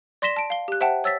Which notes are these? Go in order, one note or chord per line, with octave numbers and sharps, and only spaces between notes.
D5 C6 A#6 B6 E7 G7
A5 D7
F5 G7
G4 F#6
C5 E5 F#5 G5 A5
C#5 E6 A6 B6